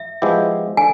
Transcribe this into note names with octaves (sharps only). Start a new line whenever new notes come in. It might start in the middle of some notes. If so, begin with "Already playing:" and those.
Already playing: E5
F3 G#3 B3 E4 G4
D3 G#5